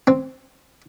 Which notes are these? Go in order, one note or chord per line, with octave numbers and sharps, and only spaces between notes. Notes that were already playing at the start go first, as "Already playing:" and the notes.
C4